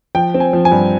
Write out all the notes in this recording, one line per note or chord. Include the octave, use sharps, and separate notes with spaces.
F3 G5
C4
G#5
F3
G#5
G2